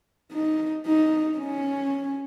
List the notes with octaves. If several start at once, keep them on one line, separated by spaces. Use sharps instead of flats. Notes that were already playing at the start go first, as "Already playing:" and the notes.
D#4
D#4
C#4